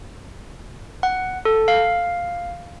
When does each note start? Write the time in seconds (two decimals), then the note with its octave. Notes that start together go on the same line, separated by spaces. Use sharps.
1.03 F#5
1.45 A4
1.68 F5